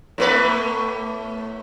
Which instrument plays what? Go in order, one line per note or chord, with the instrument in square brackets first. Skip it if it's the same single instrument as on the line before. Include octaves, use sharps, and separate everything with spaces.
[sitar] A2 A3 B4